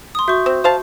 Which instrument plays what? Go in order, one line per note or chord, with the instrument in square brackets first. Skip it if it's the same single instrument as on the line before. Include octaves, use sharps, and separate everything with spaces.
[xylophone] C6 D#6
[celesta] F#4 G6 [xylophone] E5 C#6
[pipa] C4
C5 F5 A5